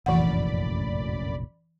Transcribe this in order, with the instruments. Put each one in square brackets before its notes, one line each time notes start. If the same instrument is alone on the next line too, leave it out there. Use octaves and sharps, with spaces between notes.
[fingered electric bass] F1 A#1 A2 [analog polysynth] F#2 D5 B5 [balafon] E3 F#5